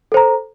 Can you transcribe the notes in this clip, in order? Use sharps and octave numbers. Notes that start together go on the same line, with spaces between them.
A4 C5 A#5